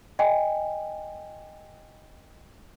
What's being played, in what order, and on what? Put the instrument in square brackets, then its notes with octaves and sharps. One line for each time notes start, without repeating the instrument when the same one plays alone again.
[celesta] D#5 G5 G#5